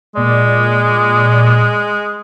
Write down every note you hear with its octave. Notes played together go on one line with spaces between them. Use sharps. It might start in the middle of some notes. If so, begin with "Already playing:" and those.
A#2 G#3 D5